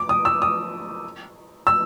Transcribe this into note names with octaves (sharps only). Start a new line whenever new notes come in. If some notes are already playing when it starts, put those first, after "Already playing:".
Already playing: D6
D#6
E6
D#6
E6